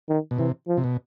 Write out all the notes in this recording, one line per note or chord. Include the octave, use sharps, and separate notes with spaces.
D#3
B2
C3 E3
F3
C3
B2